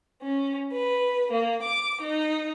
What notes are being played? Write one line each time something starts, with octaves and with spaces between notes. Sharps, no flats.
C#4
B4
A#3
D6
D#4